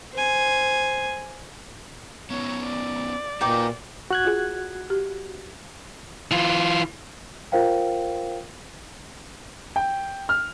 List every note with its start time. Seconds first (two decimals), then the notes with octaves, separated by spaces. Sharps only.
0.14 C5 G#5
2.30 B3 C#4 D#4 C#5
2.64 D5
3.41 A#2 D#4 F#4 B4 D#5 G5 D6
4.11 F#4 F#6 G#6
4.25 F4 G#4
4.90 G4
6.31 E3 F4
7.52 F4 A#4 C5 F5 G5
9.76 G5
10.29 F6